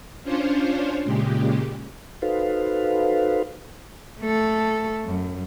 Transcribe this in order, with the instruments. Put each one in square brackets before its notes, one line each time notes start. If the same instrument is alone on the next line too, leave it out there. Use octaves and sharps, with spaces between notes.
[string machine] C#4 D4 F4 C5 C#5
A#2 C#3 G#3 G4
[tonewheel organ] D#4 F#4 A4 B4 C5 F5
[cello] A3 A4
F#2